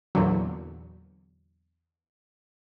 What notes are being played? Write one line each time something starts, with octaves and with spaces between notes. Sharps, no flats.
E2 A#2 D3 F#3